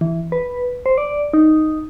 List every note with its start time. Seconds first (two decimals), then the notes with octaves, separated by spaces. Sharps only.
0.01 E3
0.32 B4
0.86 C5
0.98 D5
1.33 D#4